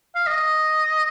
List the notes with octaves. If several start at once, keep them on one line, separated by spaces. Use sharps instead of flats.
F5
D#5